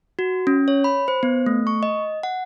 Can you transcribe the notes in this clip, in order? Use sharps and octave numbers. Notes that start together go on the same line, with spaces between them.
F#4
C#4
C#5
B5
C5
B3
A3
C#6
D#5
F#5